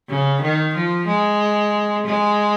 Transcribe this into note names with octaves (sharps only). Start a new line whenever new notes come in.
C#3
D#3
F3
G#3
G#3